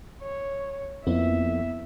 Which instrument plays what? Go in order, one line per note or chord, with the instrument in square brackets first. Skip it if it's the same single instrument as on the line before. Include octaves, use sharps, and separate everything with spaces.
[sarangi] C#5
[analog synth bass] F2 [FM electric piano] A#3 B3 E4 [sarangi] E5